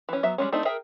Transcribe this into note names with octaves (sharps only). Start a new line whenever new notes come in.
E3 C#4
F#3 B3 E5
G3 G#3 C#4
A3 C4 D4 D#4
G#4 A#4 E5 G5